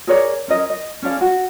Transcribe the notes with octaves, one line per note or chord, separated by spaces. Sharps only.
G#4 A#4 C#5 D5
C#4 A#4 D#5
D#5
C#4 D4 G#4 F5
F#4